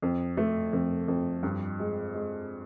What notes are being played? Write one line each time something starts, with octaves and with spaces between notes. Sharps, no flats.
F2
A3
F2
F2
G2
G#3
G#3